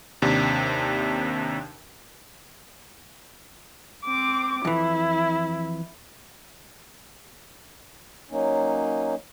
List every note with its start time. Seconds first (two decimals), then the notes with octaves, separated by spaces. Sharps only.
0.22 D#2 C3 D4
4.05 C4 D6
4.65 F2 E3 E4
8.31 F#3 A#3 C#4 D#4